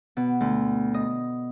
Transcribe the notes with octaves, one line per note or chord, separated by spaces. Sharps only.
B2
D2
D#5